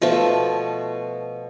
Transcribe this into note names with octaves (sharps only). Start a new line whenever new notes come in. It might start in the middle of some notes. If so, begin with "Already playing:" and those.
B2 F3 A3 E5